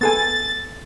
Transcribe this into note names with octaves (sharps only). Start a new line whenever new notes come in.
B3 A4 G#5 A6